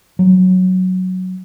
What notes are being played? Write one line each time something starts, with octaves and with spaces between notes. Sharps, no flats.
F#3